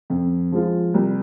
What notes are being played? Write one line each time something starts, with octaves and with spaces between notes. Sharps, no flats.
F2
F3 G#3 F4
C2